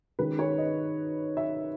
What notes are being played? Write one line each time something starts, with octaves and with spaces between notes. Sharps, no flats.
D#3 G#3 C#4 B4
C#5
D#5
E5